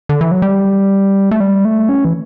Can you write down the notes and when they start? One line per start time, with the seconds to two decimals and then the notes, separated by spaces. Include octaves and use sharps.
0.09 D3
0.21 E3
0.32 F#3
0.42 G3
1.31 A3
1.40 G3
1.65 A3
1.89 C#4
2.05 E3